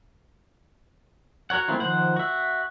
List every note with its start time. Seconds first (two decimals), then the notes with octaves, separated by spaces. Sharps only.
1.50 F#4 A#4 C#5 F#5
1.68 A3 A#3 C4 E4 F4
1.80 D#3 F3 C5 F#5
2.16 F#4 E5